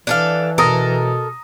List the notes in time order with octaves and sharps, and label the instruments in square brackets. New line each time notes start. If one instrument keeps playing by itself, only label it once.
[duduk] E3 [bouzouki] D4 A4 F5
[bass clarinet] B2 [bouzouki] A4 A#4 [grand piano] A#5 D#6 A#6